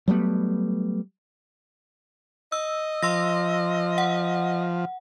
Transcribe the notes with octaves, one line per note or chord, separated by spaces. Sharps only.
F#3 G3 A3 B3
D#5 E6
F3 C6 E6 A#6
F#5